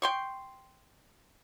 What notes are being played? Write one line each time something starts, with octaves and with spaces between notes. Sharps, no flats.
G5 C6 C#6